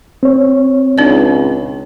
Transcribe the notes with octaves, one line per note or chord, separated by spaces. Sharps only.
C4 C#5
C#2 D4 D#4 D5